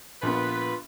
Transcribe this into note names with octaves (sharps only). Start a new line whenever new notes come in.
A#1 B3 F4 B4